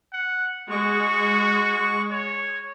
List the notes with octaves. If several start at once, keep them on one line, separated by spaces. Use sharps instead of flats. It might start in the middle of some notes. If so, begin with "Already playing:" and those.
F#5
G#3 F#4 C#6
C#5